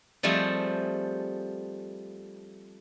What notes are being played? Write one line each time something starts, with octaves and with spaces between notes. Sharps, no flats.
F3 G3 A3 C4 G#4